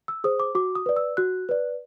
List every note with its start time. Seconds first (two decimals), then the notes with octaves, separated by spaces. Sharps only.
0.08 E6
0.24 G#4 C5 D#6
0.40 D6
0.55 F#4 D6
0.75 D#6
0.86 B4 D5
0.96 E6
1.17 F#4 F#6
1.49 B4 D5